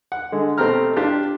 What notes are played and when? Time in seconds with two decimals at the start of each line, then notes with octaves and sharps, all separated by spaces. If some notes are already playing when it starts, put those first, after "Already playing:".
0.12 F#5
0.32 D3 G#3
0.58 B2 A3 C4 G4 A#5 F6
0.96 D4 F4 G4